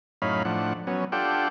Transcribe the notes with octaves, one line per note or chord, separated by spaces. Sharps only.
F#2 A2 C#4 D#4 F5 B5
A2 F3 D4 F#5
F#3 B3 C#4
D4 F4 G4 A4 F#5 G5